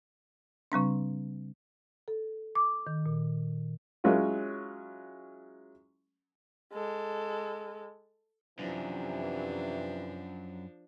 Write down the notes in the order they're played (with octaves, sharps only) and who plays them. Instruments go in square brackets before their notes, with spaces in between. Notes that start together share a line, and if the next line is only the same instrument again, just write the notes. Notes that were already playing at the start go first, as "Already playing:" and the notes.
[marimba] C#3 G3 C4 D4
A4
D6
D#3
A#2
[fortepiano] F#3 G#3 C#4 E4 F4
[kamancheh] G#3 A4
[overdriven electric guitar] F#2 [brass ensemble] C3 E3 [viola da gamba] F3 D4